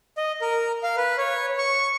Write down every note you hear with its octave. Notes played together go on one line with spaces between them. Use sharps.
D#5
A#4
F5
B4
C#5
C#6